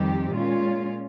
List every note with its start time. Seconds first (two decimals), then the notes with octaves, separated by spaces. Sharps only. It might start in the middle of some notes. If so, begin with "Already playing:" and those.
Already playing: F2 D#3 G3 C4 G4
0.33 A#2 G#3 C#4 F4